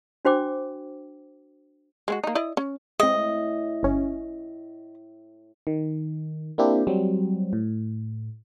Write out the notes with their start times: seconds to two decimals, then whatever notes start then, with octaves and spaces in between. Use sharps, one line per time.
0.25 D4 F#4 C5 G5 D6
2.08 G#3 C4 F#4
2.24 A#3 D#4
2.35 E4 D5 D#5
2.57 C#4
3.00 A2 G#3 C4 D#5 E5
3.83 G1 C#4
5.67 D#3
6.58 A#3 C4 D4 E4 G4
6.87 F#3 G3 C4
7.53 A2